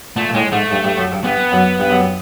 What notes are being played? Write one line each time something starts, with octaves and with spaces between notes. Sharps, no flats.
A#2 A3
A#2
A2 G#3
G#2 A3
G2
G2
F#2
G2
G2 B3
F#2
G2
F#2